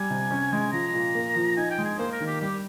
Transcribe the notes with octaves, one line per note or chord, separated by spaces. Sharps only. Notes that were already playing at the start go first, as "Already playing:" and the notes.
Already playing: G3 G#5
C3
C#4
G#3
F3 A#5
A#2
A#3
F3
D#4 G#5
G5
G#3
G#5
A#3 C5
A#4
D#3
G4
G3 G4